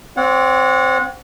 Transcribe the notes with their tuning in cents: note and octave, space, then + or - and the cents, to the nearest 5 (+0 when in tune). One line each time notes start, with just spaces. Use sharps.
C4 +0 C#5 +40 F#5 -30